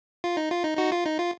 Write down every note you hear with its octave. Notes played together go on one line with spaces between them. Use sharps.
F4
D#4
F4
D#4
D#4 F#4
F4
D#4
F4